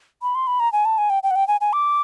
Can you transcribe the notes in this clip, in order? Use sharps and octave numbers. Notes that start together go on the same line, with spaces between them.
B5
C6
B5
A#5
G#5
A5
G#5
G5
G5
F#5
G5
G#5
G#5
D6